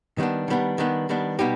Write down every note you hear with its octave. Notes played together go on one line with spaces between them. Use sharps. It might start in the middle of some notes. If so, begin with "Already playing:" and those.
D#3 G3 B3 D4
D#3 G3 B3 D4
D#3 G3 B3 D4
D#3 G3 B3 D4
B2 G3 B3 D#4 G4